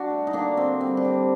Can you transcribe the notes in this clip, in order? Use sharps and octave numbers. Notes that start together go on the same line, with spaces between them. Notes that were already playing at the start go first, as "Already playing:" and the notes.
Already playing: D4 F#4
A3
D#4
D3 A#3 D4
D3 C4
G3 C4
D4
G3 C4